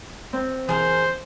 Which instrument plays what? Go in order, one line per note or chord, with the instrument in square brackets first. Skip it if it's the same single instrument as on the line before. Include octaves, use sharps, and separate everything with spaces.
[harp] C4
[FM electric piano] E3 [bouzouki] G#4 A#4 [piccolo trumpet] C5